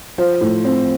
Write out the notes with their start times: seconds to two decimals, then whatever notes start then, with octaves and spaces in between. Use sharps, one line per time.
0.18 F3 C5
0.41 A2
0.64 C4